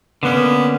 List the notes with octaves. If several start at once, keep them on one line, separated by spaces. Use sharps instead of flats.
D3 A#3 B3 C#4